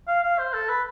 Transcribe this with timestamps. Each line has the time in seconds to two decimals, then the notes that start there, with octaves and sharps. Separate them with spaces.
0.08 F5
0.23 F5
0.39 C5
0.53 A4
0.69 B4